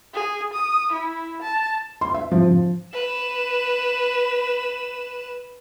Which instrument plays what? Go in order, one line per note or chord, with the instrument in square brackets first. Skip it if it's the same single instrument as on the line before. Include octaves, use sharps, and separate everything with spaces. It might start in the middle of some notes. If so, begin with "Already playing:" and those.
[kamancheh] G#4
D#6
E4
A5
[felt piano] C6
E5
F3
F3
[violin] B4 E7